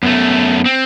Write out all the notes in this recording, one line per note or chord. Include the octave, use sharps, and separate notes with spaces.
F#2 A3 B3
C4